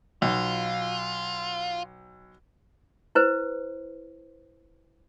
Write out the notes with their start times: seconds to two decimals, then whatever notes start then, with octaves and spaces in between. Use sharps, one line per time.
0.22 B1 F4
3.15 E4 B4 C5